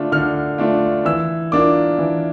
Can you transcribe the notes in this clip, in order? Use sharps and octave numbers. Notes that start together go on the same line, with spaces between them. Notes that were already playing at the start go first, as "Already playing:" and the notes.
Already playing: D3 A3 D4 F4
D3 F6
A3 D4 F4
E3 E6
A#3 D4 F4 D6
E3